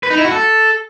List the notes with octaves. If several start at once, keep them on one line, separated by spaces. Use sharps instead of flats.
B4
D#4
E4
F#4
A4